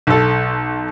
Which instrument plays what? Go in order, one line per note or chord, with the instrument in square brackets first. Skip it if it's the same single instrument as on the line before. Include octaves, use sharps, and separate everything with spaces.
[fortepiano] B1 A4